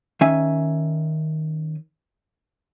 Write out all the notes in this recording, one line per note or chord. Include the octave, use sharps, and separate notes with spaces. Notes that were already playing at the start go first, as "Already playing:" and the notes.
D#3 C#4 E5 G#5